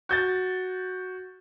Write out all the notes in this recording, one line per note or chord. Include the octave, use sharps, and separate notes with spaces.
F#4 G6 A6